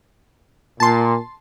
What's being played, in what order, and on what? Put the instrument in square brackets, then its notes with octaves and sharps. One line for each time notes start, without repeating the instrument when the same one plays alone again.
[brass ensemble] A#2 [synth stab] A5 C6